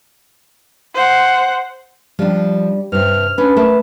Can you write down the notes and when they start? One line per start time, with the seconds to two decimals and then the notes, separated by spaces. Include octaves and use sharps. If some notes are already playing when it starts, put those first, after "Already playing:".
0.94 C5 F#5
2.19 F3 G3 D4
2.92 G2 C3 F6
3.38 C#4 D4 B4
3.56 A3 A#4 A5